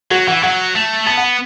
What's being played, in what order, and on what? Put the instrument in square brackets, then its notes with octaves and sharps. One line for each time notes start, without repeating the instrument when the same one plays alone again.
[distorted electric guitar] F#3 [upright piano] F#4
[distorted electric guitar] E3 [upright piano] F#5
[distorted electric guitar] F#3 [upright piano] F#5
[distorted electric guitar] A3
[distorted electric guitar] B3 [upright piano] A5
[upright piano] F#5